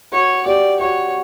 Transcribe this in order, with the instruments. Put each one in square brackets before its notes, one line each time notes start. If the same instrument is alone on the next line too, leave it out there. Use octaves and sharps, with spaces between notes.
[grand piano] F#4 [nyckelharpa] C#5
[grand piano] G4 [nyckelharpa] D5
[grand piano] F#4 [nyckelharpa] C#5